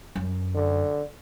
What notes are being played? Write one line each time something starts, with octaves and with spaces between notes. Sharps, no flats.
F#2
D3